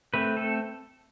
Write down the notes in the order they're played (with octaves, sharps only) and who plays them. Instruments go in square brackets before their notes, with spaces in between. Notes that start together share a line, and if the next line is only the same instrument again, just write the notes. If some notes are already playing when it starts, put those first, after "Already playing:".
[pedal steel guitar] A3 C4 B4
A4